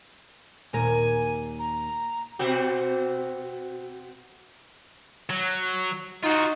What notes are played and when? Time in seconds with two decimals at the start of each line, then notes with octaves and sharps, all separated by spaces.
0.73 D#2 A#2 A#4 G#5
1.59 A#5
2.39 B2 C4 F#4
5.30 F#3
6.23 D#4 F4 F#4